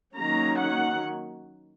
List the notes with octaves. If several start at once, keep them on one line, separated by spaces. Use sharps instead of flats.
D#3 F#3 A#3 C#4 A#5
F#5